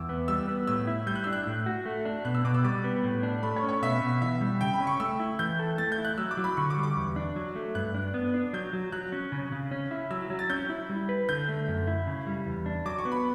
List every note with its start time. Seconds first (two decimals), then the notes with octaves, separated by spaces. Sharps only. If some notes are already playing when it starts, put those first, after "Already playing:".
Already playing: E2 D6 E6
0.09 B3
0.28 G3 E6
0.48 B3
0.67 A2 E6
0.87 E4
1.07 G3 G6
1.15 F#6
1.24 D4 E6
1.33 F#6
1.46 A2
1.66 F#4
1.86 A3
2.05 D4
2.25 B2 F#6
2.35 E6
2.44 B2 D6
2.54 E6
2.64 G3 D6
2.84 B3
3.04 A2
3.23 D4
3.43 A3 B5
3.56 C#5
3.63 C#4
3.69 C#5
3.82 B2 E5
4.01 B2
4.22 E3 E5
4.41 G3
4.61 C#3 G5
4.73 B5
4.80 C#4
4.87 C#6
5.00 A3 E6
5.20 E4
5.39 E3 G6
5.59 A4
5.78 A3 A6
5.92 G6
5.98 E4
6.05 F#6
6.18 F#3 E6
6.31 D6
6.37 F#3
6.44 B5
6.57 D3 C#6
6.70 D6
6.77 G3
6.83 D6
6.97 E2
7.16 D4
7.36 F#3
7.56 A3
7.75 G2 F#6
7.94 D4
8.14 B3
8.34 D4
8.53 F#3 G6
8.73 F#3
8.92 F#3 F#6
9.12 C#4
9.32 C#3
9.52 C#3
9.71 C#4
9.91 E4
10.11 F#3 E6
10.30 F#3
10.39 A6
10.50 C#4 G6
10.70 E4
10.90 G3
11.09 B4
11.29 D3 G6
11.48 A3
11.68 F#2
11.87 E4
12.07 C#3
12.27 G3
12.46 E2
12.66 D4
12.86 F#3 D6
12.98 C#6
13.05 B3
13.12 B5